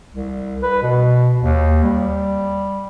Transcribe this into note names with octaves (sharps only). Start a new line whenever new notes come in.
C2
B4
B2
D#2
G3